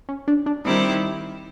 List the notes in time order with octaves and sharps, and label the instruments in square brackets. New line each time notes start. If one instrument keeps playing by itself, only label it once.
[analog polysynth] C#4
D4
D4
[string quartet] D#3 G3 C4 E4 G4 [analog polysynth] D#4